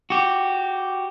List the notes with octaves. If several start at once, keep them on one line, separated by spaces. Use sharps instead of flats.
F#4 G4